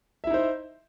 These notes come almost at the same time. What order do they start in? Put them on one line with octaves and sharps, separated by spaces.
E5 E4 D#4 C5